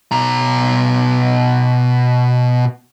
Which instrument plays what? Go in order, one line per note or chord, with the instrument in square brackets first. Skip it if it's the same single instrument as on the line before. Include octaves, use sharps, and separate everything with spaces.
[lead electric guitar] B2 A#5